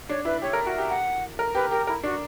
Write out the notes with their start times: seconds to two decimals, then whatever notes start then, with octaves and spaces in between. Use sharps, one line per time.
0.09 D4 C#5
0.25 E4 B4
0.42 G4 C#5
0.53 A#4
0.66 F#4
0.78 G4
0.90 F#5
1.39 A#4
1.55 G4 B4
1.71 G4 A#4
1.87 E4 A#4
2.03 D4 F#4